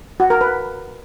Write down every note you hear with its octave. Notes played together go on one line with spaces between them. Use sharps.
F#4
A#4
B4